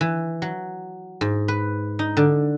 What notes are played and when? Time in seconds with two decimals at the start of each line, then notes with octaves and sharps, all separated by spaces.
0.01 E3
0.42 F#3
1.21 G#2
1.48 B4
1.99 D#4
2.17 D3